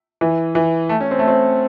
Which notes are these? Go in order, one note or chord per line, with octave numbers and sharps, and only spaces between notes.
E3
E3
A3
C#4
C4
A3
C4